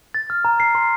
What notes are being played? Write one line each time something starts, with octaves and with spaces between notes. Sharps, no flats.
A6
F6
A#5
C7
C6